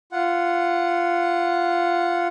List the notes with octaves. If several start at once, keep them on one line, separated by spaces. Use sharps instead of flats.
F4 F#5